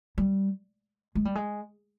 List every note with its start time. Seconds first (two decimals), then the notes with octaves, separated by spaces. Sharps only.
0.18 G3
1.15 G#3
1.25 G3
1.35 G#3